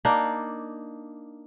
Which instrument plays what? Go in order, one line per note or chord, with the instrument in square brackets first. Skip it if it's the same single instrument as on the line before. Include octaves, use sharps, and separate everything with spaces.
[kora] A#3 D4 D#4 D5